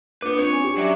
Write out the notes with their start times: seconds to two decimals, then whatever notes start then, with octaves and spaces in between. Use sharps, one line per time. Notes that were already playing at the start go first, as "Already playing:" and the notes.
0.22 A#3 B3 D4 F4 B4 D6
0.38 C4 C#5
0.52 C#4 D4 G#5
0.64 G4
0.77 F#3 D5 E5 D6